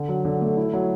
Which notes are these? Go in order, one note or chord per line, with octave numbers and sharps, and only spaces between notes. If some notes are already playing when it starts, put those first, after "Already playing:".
Already playing: D3
F#3
D3
A3
E4
F#3